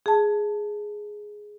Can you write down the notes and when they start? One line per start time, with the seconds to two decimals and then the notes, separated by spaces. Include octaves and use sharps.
0.06 G#4 A5